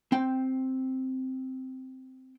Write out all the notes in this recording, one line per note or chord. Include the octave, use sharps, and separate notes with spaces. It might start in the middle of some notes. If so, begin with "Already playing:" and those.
C4 G5